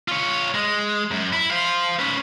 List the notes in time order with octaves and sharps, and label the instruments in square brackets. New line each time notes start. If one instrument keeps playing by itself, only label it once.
[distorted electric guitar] F4 C#5
G#3
F#2
E4
C5 F5
C#4 B4